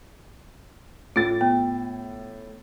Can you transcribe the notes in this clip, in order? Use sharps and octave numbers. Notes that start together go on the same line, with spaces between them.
A2 F4 A6
B3